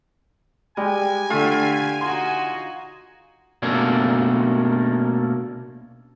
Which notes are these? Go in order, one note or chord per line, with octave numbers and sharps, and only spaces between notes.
G3 G#3 G#5
D3 A3 F4 G4 F5
D#4 F#4 C6
B2 A3 A#3 C#4 D4